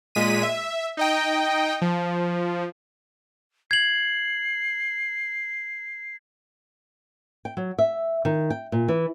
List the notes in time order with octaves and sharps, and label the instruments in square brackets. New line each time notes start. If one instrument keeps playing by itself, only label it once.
[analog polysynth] A#2 G#3 B6 D#7
E5
D#4 D#5 G5
F3
[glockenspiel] G#6 F#7 [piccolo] C7
[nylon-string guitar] G5
F#3
E5
D#3
G5
A#2
E3